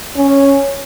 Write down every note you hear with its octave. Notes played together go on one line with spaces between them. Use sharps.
C#4